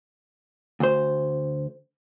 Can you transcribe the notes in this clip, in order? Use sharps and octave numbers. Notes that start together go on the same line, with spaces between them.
D2 C5